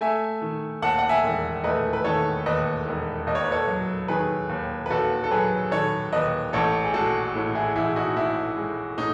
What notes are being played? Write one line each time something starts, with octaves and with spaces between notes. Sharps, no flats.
A3 E5 G#5
D#3
D#2 F#5 A5
F#5
E5 G#5
E1
A3 B4 D#5
B4
D#3 A4 C#5
D#2 B4 D#5
E1
D#2 D#5
C#5
B4
A4 C#5
F#3
D#3 G#4 B4
D#2
B4
D#2 F#4 A4
A4
F#3 G#4 B4
D#3 A4 C#5
D#2 B4 D#5
A1 A4 C#5
G#4
G#3 F#4 A4
A2
E4 G#4
A1 E4 G#4
D#4 F#4
A1 E4
G#3
A2 D#4